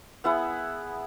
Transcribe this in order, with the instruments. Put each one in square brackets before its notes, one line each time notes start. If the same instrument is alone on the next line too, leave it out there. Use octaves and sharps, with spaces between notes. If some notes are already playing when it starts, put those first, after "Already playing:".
[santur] B3 E4 G#4 F#5